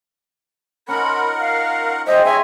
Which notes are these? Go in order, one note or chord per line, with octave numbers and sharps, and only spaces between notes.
C#4 D#4 F4 A#4 F#5 B5
F5
G#3 G4 C5 D#5 E5
C#5 D#5 E5 G#5 C6